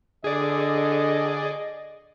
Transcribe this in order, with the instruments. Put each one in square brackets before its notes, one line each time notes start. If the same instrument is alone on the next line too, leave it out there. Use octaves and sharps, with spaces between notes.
[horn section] D3 [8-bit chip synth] G#4 D5 [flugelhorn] D#5